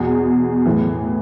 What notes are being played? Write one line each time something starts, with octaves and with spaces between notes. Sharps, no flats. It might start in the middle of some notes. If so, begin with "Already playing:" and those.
Already playing: E2 B2 G#4
A2 E3